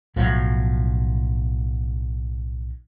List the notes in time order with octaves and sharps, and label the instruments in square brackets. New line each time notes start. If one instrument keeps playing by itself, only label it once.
[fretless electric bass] B1 A2 F3 F#3